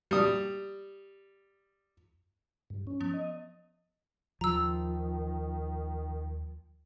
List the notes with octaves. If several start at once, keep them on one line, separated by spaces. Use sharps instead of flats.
G3 D#6
G2
C#4
F3 B3
D#5
D#2 D#3 F3 A#5 E6